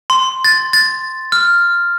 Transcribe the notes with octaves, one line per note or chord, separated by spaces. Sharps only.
C6
A6
A6
F6